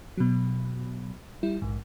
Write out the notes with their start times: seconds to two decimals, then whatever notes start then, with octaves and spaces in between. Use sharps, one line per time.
0.17 B2 F#3
1.43 G3 E4
1.62 A#1 G#2